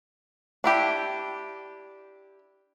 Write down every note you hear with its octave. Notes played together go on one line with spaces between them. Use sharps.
D4 E4 G4